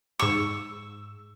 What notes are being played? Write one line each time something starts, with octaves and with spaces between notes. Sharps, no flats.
G#2 C#6 E6